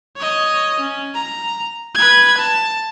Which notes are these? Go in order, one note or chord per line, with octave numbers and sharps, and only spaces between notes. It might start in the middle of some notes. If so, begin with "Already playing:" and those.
C#5 D#5
C#4
A#5
B4 G#6
A5